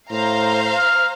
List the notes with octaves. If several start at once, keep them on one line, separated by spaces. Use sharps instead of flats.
A2 C5 F5 A#5
F6